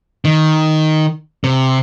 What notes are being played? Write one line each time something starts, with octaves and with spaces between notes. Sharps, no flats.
D#3
C3